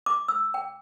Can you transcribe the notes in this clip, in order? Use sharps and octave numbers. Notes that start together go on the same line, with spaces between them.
D6
E6
G5